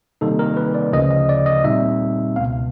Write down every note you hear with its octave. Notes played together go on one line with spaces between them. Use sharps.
C3 D#3 G3 A#3 D#4 A4
A#4
B4
D5
D2 C#3 F3 D#5
D#5
D5
D#5
A#2 G3 C4 D#4 E5
C#2 B2 G#3 B3 F5